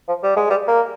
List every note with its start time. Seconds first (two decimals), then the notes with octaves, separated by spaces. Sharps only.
0.08 F3
0.23 G3
0.37 G#3
0.50 G3
0.68 A#3